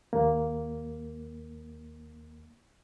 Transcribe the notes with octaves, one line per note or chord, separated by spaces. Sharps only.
D#2 A#3